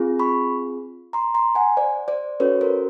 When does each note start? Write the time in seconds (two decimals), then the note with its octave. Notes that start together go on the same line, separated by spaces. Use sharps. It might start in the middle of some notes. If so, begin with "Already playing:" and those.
Already playing: C4 F4 G#4
0.19 B5 C#6
1.13 A#5 C6
1.35 A#5 C6
1.55 F#5 G#5
1.77 C5 D5
2.08 C5 D5
2.40 C#4 F#4 A4 B4 C#5
2.61 A#4 C5